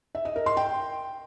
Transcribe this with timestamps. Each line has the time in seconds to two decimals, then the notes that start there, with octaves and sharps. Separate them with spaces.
0.15 E5
0.25 D#5
0.36 A#4
0.46 C6
0.57 G5